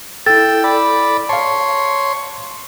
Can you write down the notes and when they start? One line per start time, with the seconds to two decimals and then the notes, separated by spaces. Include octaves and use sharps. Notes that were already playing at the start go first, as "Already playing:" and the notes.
0.26 E4 A4 G5 E6 A6
0.64 D5 B5
1.29 C#5 F5 A5 C6